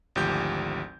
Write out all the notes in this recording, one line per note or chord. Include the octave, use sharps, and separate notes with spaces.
G#1 D2 F3 G4 G6